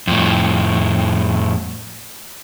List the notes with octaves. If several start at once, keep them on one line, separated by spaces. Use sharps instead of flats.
F2 A2